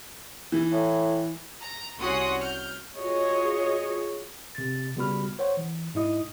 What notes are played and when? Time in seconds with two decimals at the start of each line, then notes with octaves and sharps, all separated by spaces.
0.52 E3
0.71 A2
1.60 A#5
1.98 C2 C#4 F#4 F#5 C6 D#6
2.39 F6 G6
2.97 F4 F#4 G#4 C#5 D#5
4.55 C3 A6
4.96 C#3 G3 B3 F#4 B5 F6
5.39 C5 C#5 F#5
5.57 E3
5.94 G#2 D#4 E4 D#5 D#6